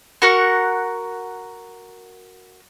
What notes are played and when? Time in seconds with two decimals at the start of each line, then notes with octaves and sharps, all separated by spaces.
0.22 F#4 A#4 F#5 C#6